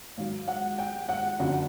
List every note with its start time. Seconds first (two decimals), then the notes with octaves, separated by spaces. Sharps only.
0.17 G#2 D#3 F#3 F5
0.48 F#5
0.79 G5
1.09 F#5
1.39 F#1 F2 D3 F#3 F#5